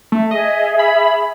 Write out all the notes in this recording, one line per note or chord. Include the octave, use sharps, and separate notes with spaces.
A3
G#4 D#5 E5
B5